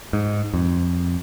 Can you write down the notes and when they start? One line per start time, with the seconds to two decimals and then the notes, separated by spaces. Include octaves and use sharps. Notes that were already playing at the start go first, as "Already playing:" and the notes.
0.13 G#2
0.54 F2